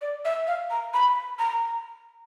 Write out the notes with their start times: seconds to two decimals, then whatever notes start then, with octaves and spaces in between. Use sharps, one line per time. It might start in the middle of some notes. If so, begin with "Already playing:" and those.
0.01 D5
0.25 E5
0.47 F5
0.71 A#5
0.94 B5
1.39 A#5